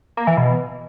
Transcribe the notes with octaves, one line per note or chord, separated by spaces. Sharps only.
A#3
E3
B2